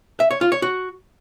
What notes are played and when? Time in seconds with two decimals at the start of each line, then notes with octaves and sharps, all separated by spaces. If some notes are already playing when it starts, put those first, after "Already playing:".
0.20 E5
0.31 C#5
0.41 F4
0.52 C#5
0.62 F#4